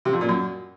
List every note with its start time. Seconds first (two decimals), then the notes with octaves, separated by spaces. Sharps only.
0.05 C3
0.13 F2
0.21 A#2
0.29 F#2